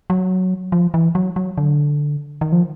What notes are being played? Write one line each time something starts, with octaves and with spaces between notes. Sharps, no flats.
F#3
F3
E3
F#3
F#3
D3
D#3
F3